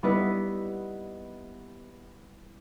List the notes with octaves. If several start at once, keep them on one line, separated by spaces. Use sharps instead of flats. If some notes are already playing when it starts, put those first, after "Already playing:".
G3 B3 D#4 E4 B4 D#5